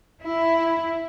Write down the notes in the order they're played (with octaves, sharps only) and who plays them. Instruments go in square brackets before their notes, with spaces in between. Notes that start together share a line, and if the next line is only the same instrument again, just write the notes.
[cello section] E4